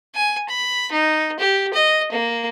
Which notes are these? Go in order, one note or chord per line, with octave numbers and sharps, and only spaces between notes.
G#5
B5
D#4
G4
D#5
A#3